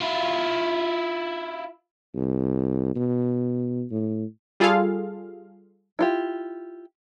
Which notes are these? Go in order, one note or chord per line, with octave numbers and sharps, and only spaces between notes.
E4 F4
C2
B2
A2
G3 F4 G#4 A4 F5
E4 F4 G4